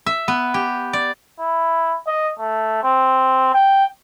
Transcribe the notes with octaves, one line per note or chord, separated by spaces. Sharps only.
E5
B3
G4
D5
E4
D#5
A3
C4
G5